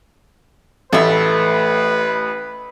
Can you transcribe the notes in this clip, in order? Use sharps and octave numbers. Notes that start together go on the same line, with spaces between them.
A1 A3 B4 E5